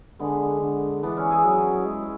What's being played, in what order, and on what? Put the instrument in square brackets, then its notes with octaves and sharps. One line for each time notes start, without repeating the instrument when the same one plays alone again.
[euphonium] D3 [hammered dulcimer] G#3 B3
[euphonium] D3
[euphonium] E3 [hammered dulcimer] B3 D4
[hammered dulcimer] C#4 E4
E4 G#4
[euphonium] F#3
G#3